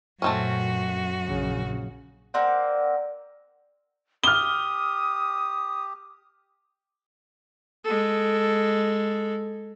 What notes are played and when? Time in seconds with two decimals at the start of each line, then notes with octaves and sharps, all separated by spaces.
0.22 F#2 A#2 A3 C4 C#4 F#4
1.28 A#1 C#3
2.34 A#3 C4 D5 F#5
4.24 G4 D#6 F6 G7
7.84 G#3 A4